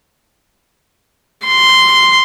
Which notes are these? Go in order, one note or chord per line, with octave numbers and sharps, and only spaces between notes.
C6